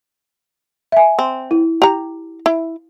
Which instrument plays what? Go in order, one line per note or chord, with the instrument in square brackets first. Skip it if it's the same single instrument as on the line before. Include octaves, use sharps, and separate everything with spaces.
[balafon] E5 G#5
[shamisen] C4
[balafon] E4
[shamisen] G4 A#5
E4